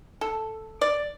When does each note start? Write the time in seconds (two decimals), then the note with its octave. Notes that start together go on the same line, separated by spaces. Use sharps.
0.21 A4
0.81 D5